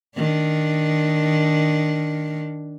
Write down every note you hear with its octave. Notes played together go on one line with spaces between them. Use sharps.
D#3 D4